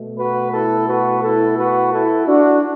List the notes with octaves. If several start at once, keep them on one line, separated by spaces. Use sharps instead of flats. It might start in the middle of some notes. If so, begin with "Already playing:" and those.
Already playing: B2 A3
F#4 B4
E4 A4
F#4 B4
E4 A4
F#4 B4
E4 A4
D4 F#4